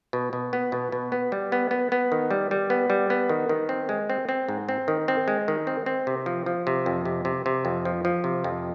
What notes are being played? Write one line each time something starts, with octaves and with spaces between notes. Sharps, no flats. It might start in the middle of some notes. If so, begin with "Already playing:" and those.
B2
B2
B3
B2
B2
B3
G3
B3
B3
B3
D#3
G3
G3
B3
G3
B3
D#3
D#3
C4
G#3
C4
C4
G#2
C4
D#3
C4
G#3
D#3
C4
C4
C3
F3
F3
C3
F2
C3
C3
C3
F2
F3
F3
C3
F2